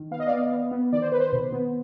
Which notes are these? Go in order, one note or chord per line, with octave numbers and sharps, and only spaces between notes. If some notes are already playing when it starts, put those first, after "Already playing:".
Already playing: D#3
B3 F5
D#5
B3 D5 F5
B3
B3
D#3 D5
C5
D#3 B4
C5
B2
B3